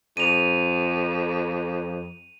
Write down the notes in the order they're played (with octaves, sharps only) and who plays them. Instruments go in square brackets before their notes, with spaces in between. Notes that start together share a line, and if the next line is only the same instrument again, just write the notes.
[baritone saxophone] F2 [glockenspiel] D#7 F7